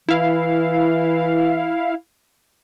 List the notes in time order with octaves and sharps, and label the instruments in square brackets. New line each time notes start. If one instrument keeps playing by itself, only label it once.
[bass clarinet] E3 [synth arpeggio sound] E4 F5